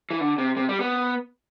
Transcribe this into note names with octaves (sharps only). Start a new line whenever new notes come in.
E3
D3
C3
C3
G3
B3